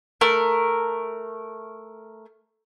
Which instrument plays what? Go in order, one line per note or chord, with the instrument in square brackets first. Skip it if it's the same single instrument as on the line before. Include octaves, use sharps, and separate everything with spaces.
[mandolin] A3 A#4